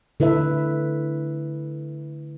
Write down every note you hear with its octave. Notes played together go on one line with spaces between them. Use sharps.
D3 E4 B4 E5